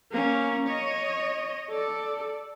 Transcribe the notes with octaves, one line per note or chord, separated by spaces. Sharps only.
A#3 C#4
C#5 D#5
A4 D5